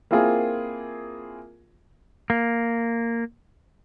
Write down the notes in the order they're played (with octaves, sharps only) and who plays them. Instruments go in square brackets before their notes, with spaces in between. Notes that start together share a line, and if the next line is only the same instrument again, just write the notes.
[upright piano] A#3 C4 E4 F4 G#4 A#4
[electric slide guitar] A#3